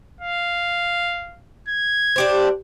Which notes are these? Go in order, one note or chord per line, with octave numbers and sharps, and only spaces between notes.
F5
G#6
D4 G4 C5